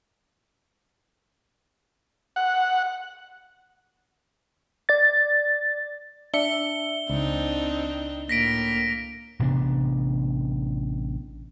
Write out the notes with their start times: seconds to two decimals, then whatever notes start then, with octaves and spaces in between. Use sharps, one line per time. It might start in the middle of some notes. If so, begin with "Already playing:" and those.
2.36 F#5
4.89 D5 A6
6.34 D4 E5 C#7 G7
7.10 C#2 C4 D4 D#4
8.29 A2 A#3 A#6 B6 D7
9.39 A1 C3 B3 D4